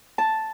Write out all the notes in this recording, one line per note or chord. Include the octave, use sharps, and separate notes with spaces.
A5